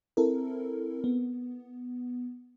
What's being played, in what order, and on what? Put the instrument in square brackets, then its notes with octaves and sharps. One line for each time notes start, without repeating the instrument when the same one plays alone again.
[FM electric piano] C4 E4 A4 A#4
B3